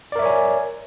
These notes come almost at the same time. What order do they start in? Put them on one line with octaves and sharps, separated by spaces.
D5 A#4 E5 C#5 G#5